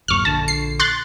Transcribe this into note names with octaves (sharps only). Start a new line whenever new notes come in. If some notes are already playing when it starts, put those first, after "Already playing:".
D1 F#2 A#2 C#6 F6
A#1 D3 A5
C7
C6 F#6 A6